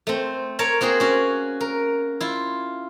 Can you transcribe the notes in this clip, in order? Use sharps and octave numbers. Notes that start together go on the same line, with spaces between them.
A3 C4
A#4 C#5 A5
A#3 C4 F#4 G#4
C#4 F#4
A#4
E4 F4